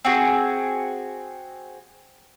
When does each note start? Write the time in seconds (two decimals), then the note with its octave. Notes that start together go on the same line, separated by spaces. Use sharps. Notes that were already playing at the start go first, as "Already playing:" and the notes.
0.05 C4 F#4 G#4